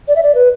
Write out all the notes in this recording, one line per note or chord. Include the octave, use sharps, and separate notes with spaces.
D5
E5
D5
B4